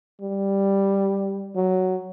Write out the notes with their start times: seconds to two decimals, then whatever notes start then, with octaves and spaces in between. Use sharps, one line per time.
0.21 G3
1.56 F#3